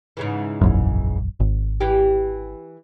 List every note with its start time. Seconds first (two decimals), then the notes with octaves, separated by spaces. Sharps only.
0.17 G#2 C#3 E3
0.61 E1 A#1 F#2
1.40 G#1
1.80 E3 G4